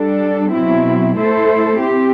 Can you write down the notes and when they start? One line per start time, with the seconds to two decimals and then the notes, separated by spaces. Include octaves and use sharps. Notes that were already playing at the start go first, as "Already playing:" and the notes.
Already playing: G3 D4 A4
0.52 B2 F#3 C4 E4
1.16 A3 E4 A4 C5
1.80 C4 G4